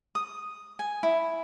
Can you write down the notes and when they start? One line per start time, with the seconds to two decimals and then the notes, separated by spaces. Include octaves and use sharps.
0.15 D#6
0.79 G#5
1.03 E4